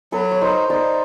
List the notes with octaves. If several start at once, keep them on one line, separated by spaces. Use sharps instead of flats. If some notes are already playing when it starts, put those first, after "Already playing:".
F#3 A4 B4
C#5
D#4 A#4 C5
D#4 C5 D5